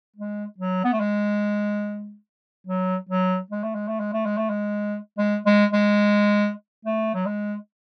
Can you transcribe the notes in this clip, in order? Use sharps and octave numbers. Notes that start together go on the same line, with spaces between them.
G#3
F#3
B3
A3
G#3
F#3
F#3
G#3
A3
G#3
A3
G#3
A3
G#3
A3
G#3
G#3
G#3
G#3
A3
F#3
G#3